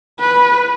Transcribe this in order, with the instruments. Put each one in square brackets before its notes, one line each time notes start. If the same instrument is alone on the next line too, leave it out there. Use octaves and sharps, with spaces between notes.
[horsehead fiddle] B4